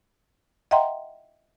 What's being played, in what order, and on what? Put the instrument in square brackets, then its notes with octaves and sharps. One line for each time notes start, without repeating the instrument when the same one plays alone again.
[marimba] D#5 E5 F#5 G5 A#5 C6